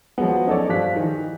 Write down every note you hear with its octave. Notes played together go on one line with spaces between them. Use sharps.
F3 F#3 G#3 B3
C#4 D#4 A4 C#5 D5
G2 F3 F5 F#6 B6
D#3 E3